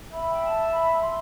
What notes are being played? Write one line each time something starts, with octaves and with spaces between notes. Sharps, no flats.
E5 B5
G5
A5
B5
C6